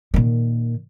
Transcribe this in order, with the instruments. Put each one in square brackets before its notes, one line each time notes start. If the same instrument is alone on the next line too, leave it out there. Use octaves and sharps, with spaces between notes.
[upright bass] A#2 D#3